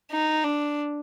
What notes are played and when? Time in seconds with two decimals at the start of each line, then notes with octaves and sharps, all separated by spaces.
0.11 D#4
0.44 D4